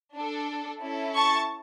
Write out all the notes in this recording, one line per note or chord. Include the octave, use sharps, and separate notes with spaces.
D4 A4
C#4 E4 A4
A5 C#6